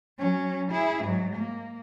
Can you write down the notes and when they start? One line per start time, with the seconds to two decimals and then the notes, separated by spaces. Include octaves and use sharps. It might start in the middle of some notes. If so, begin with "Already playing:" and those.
0.19 F#3 C#4
0.71 E4 G#4
1.04 G#2 F#3
1.35 A#3